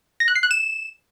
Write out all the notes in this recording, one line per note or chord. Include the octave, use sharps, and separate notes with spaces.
A#6
F#6
C7
F#6
E7